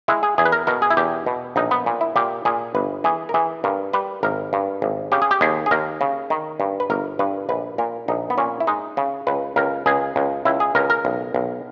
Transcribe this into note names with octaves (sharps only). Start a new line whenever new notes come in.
G#3 E4
G#4
E2 G#4
B4
A#4
B2 A#4
G#4
E4
E2 G4
B2
A#1 D#4
B3
A#2
E4
A#2 G4
A#2 G#4
G1 B4
E3 G#4
A#4
E3 G#4
G2 A#4
G3 B4
G#1 A#4
G2
G#1
C#3 G4
G#4
G4
D#2 G#4
G#4
D#2 A#4
C#3
D#3
G2
B4
G1 A#4
G2 B4
A#1 B4
A#2 A#4
A#1 D#4
B3
A#2 C#4
E4
G#3 D#4
C#3
C#2 B4
C#2 A#4
C#2 G#4
C#2
C#2 E4
G#4
C#2 A#4
A#4
B1
B1